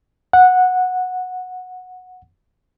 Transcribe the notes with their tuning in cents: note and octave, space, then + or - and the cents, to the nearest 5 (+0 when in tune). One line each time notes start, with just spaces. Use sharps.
F#5 -10